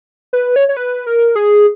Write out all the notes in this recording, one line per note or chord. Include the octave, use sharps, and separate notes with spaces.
B4
C#5
C#5
B4
A#4
G#4